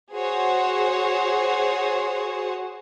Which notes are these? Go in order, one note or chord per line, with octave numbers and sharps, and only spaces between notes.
F#4 G#4 C5 C#5